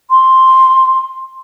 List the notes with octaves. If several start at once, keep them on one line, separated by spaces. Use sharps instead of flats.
C6